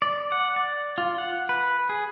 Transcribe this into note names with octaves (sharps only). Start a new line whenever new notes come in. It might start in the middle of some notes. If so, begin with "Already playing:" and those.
D5
F#5
D5
F4
F#5
B4
G#4